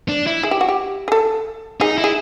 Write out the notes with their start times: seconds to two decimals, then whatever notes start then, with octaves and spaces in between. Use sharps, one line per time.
0.09 D4
0.27 E4
0.43 G#4
0.51 G4
0.61 F#4
0.69 G4
1.08 G#4
1.12 A4
1.80 D#4 G#4
1.98 E4
2.04 G#4